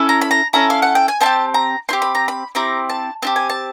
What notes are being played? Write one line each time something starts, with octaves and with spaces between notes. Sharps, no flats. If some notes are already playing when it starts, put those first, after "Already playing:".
Already playing: C#4 E4 A4
A#5
B5
A#5
C#4 E4 A4 A#5
F5
F#5
G5
G#5
C4 E4 A5
G4
A#5
C4 E4 G4 C6
B5
A#5
B5
C4 E4 G4 A#5
A5
C4 E4 G4 A5
G#5
A5